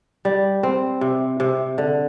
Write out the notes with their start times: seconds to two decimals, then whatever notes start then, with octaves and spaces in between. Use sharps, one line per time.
0.25 G3
0.63 C4
1.01 C3
1.40 C3
1.78 D3